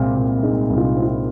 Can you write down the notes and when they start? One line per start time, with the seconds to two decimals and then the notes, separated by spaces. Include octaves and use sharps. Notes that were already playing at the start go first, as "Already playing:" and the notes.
Already playing: C2 A#2 G#3 C4
0.16 A#2
0.43 G#3 D#4
0.70 C2
0.78 F4
0.83 D#4
0.97 C4
1.02 F4